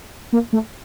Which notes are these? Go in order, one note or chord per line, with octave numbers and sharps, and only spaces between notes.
A#3
A3